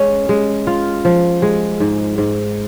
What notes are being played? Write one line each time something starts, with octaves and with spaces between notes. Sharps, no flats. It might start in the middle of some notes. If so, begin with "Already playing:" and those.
Already playing: G#3 C#4
G#3
F4
F3
G#3
G#2
G#2